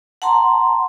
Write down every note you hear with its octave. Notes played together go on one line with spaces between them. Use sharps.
F#5 A5 A#5 C6